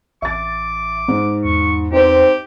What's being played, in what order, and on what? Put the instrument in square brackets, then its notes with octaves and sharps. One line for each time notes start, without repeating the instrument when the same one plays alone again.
[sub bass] A1 [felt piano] E5 A6 [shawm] D6
[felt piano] G#2
[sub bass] E2 [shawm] C#6
[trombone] C4 [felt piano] D#4 B4 C5 [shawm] G4